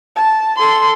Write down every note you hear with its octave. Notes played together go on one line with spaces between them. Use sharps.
A5
A4 C6